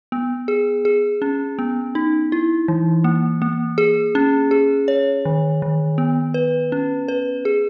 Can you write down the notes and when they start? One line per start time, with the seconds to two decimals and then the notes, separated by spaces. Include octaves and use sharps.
0.12 B3
0.48 G#4
0.85 G#4
1.22 C#4
1.59 B3
1.95 D#4
2.32 E4
2.68 E3
3.04 A#3
3.42 A#3
3.78 G#4
4.15 C#4
4.51 G#4
4.88 C#5
5.25 D#3
5.62 D#3
5.98 B3
6.34 B4
6.72 C#4
7.08 B4
7.45 G#4